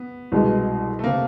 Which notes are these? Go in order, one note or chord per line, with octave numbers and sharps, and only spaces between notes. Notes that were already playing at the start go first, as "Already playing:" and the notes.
Already playing: B3
C2 B2 G#3
A3
C3 A#3